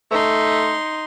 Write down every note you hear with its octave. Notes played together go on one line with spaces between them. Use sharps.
A3 D#4 C6